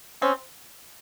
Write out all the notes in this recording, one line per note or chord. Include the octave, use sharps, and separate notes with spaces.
C4 C#4